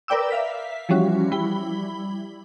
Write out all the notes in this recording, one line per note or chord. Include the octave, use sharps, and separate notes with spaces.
A#4 B4 D5 G5 D6 E6
E5 F5 B6
E3 F3 G3 C#4 F#4
G3 E4 B5 G7